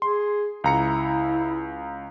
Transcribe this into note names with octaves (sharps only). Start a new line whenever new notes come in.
G#4 C6
C#2 E4 A#5 C#7